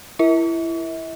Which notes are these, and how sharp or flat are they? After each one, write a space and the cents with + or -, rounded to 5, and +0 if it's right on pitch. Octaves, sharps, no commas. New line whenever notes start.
E4 +20 E5 -40